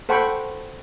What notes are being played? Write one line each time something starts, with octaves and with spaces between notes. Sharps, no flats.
A4 C5 F#5 G5 B5 C#6